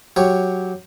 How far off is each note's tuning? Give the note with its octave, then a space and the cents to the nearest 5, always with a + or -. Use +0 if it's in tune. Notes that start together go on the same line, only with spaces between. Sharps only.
F#3 +0 G4 +0 C#5 +0